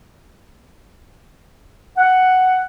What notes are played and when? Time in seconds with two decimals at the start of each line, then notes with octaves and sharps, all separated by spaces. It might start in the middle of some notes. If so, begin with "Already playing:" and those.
1.98 F#5